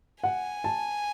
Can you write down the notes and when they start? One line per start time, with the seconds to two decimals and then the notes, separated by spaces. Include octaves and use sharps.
0.24 F#5 G#5
0.64 A5